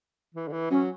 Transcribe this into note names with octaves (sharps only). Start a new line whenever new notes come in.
E3
D3
E3
F#3 C#4